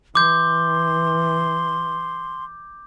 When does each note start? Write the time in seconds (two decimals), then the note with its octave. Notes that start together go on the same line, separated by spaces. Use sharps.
0.15 E3 C6 D6 G6